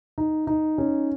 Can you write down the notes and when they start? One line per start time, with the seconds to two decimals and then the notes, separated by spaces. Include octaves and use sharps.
0.18 D#4
0.47 D#4
0.78 C#4